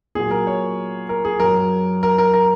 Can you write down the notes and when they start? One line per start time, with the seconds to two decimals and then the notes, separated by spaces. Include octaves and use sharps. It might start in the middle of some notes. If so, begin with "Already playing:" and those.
0.15 A#2 F#3 G#4
0.31 A#4
0.47 C#5
1.09 A#4
1.25 G#4
1.40 F#2 F#3 A#4
2.03 A#4
2.18 A#4
2.34 A#4